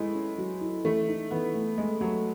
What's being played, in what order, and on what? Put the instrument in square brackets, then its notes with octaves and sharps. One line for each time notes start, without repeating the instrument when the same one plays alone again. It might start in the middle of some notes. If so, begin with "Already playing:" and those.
Already playing: [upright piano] G#3 A3 B3 [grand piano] E4
[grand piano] C#4
F#3
E4
[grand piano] E3 [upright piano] A3
[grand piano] D#4
[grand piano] E3 [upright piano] B3
[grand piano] A3
[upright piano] G#3 [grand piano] A3
[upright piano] F#3 [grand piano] A3